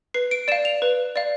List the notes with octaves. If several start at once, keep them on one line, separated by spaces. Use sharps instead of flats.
B4 C7
D7
D5 F5 E7
F7
B4
D5 F5